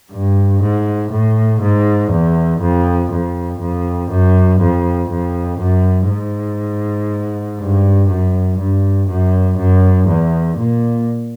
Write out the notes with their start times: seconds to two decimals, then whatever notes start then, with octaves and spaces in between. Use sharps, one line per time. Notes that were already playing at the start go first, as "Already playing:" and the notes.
0.12 G2
0.62 G#2
1.12 A2
1.61 G#2
2.11 E2
2.61 F2
3.11 F2
3.60 F2
4.10 F#2
4.60 F2
5.10 F2
5.59 F#2
6.09 G#2
7.59 G2
8.09 F#2
8.59 G2
9.08 F#2
9.58 F#2
10.08 E2
10.58 A#2